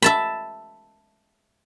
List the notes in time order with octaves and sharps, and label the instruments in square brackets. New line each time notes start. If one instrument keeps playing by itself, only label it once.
[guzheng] E5 A5 B5